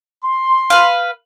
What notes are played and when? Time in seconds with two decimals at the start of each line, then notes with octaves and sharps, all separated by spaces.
0.23 C6
0.70 B4 F5